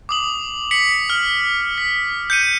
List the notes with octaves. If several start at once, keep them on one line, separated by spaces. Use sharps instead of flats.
D6 D#6 F#7
B6 C#7 F#7
F6
B6
G6 C#7 D#7